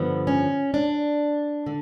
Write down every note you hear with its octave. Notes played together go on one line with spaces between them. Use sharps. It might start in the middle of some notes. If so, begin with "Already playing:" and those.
Already playing: G2 D3 F3 B3
C#4
D4
D3